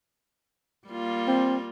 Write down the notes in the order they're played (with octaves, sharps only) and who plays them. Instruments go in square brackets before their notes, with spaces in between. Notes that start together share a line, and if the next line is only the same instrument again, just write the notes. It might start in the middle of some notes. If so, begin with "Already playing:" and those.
[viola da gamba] G3 A#3 F4
[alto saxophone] C4